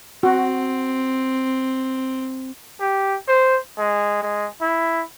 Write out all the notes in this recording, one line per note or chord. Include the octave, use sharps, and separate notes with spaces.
C4 F#4
G4
C5
G#3
G#3
E4